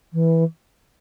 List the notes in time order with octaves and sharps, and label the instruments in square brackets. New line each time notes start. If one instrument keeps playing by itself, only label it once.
[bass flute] E3